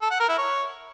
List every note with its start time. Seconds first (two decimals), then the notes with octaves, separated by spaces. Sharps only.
0.02 A4
0.11 F#5
0.20 A#4
0.29 E4
0.38 C#5